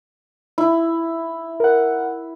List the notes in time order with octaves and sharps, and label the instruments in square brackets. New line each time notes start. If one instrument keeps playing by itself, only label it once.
[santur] E4
[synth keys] A#4 F#5